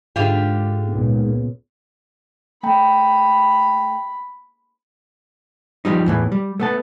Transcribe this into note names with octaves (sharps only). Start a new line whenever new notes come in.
G#2 D3 F4 G4
C#2 A#2 C#3 B3
A3 G5 A#5 B5
F3 G3 D#4
E2 A2 E3
G3
A3 B3 A5